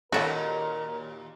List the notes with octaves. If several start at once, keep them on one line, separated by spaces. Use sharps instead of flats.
D#2 A#2 C#4 D#4 F4 F#4 A4 A#4